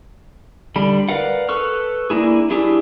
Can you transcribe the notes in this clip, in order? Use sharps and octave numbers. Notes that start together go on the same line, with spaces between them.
D3 G3 B5
A#4 B4 D5 F5 F#5
A4 B4 C#6 F6
A#3 D4 E4 G#4
F#3 D4 E4 G4 G#4